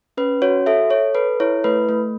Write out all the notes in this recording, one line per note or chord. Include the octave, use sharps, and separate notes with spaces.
C#4 B4
F#4 C#5
A4 E5
A4 C#5
A4 B4
E4 C#5
A3 B4
A3